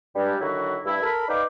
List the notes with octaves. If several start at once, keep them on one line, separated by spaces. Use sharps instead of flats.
G2 G3 G#3
D3 D#3 F#3 E4 F#4
G2 E4
A4 A#4 B5
D#4 B4 D5 F5 G5 D6